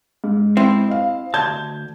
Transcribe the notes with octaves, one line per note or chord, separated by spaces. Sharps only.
G#2
C4 E4
D#5 F5
D2 A5 G6 G#6